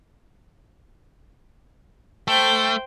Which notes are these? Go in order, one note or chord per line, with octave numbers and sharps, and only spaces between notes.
A3 C5 G5